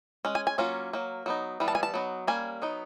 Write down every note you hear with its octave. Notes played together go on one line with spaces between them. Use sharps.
G#3 C#4
G#5
G#5
F#3 A#3 C#4 F4
F#3 A#3
F#3 B3 D#4
E3 G3 B3
A5
G#5
A5
F#3 B3 D#4
G3 A#3 C#4 G#5
F#3 B3 D#4